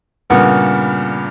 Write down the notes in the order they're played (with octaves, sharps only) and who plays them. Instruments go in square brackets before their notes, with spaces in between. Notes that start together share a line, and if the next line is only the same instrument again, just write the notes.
[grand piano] G2 A#2 C#3 [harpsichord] B3 C#6